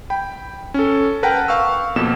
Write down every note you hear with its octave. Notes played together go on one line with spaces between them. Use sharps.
G5 B5
C#4 A4
A#4 B4 F#5 G5 A5 A#5
F5 C#6 E6
F2 B2 A#3 E7